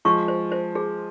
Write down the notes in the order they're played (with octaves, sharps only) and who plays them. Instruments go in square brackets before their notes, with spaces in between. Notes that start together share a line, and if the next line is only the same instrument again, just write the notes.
[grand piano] F3 G#3 [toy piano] C#6
[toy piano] C5
C5
G#4